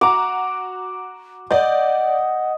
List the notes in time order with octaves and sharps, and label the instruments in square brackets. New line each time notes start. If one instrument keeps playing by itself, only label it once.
[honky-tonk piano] F#4 A#5 [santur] D6
[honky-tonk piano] D5 G6 [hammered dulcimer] D#5 [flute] F#5